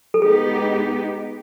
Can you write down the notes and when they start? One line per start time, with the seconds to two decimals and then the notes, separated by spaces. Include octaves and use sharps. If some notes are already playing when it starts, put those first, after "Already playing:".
0.14 A4
0.22 G#3 B3 D#4 G4 G#4